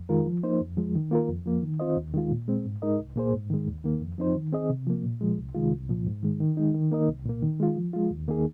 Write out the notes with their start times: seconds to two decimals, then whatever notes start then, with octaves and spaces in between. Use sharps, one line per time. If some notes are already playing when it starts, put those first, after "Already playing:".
Already playing: F2
0.09 D#3 G#3 F4 A#4
0.26 F3
0.43 A#3 D#4 C5
0.61 F2
0.77 F3 G#3
0.95 D#3
1.11 A#3 F4 A#4
1.29 F2
1.46 F3 A#3
1.63 D#3
1.80 C4 F4 C5 D#5
1.97 D#2
2.14 D#3 G#3 F4
2.31 A#2
2.48 G#3 C4
2.65 G#2
2.82 G#3 D#4 A#4 D#5
2.99 C2
3.16 A#2 A#3 G#4 C5
3.33 G#2
3.50 D#3 G#3
3.67 D#2
3.84 D#3 A#3
4.01 F2
4.18 F3 C4 D#4 C5
4.35 D#3
4.53 C4 G#4 D#5
4.70 C3
4.87 F3 A#3
5.04 A#2
5.21 F3 G#3
5.38 C2
5.55 C3 D#3 G#3 F4
5.72 C2
5.89 A#2 F3
6.06 G#2
6.23 D#3 G#3
6.40 D#3
6.57 G#3 D#4
6.74 D#3
6.91 A#3 D#4 A#4 D#5
7.08 C2
7.26 A#2 A#3
7.43 D#3
7.60 G#3 F4
7.77 F3
7.93 G#3 F4
8.11 D#2
8.28 D#3 A#3 D#4 G#4